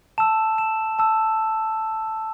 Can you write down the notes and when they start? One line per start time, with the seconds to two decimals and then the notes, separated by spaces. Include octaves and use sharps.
0.18 A5 E6 E7
0.58 E7
0.99 A5 E6